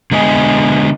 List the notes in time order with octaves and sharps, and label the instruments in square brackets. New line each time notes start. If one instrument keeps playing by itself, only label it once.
[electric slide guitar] D3 G#3 B3 D#5 G#5